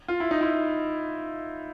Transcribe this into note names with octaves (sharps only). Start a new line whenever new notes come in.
F4
E4
D#4
E4